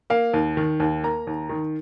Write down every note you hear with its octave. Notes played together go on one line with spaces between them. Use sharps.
A#3 F5
D#2
D#3
D#2
A#3 A#5
D#2
D#3